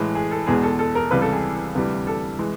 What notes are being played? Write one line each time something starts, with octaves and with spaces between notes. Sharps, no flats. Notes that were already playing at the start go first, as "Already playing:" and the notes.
Already playing: A2 E3 G#3
G#4
A4
E2 B2 G#3 G#4
A4
A4
A#4
C#2 C3 E3 G3 B4
A4
G#4
D2 C3 E3 G3
A4
E3 G#3